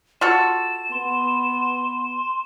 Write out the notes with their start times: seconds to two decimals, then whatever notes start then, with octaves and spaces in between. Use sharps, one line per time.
0.21 F4 F#4 A4 E7
0.92 B3 C6